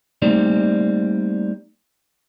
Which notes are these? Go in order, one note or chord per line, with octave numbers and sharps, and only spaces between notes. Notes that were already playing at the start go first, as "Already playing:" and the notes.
G3 A3 A#3 C4 D#4 D5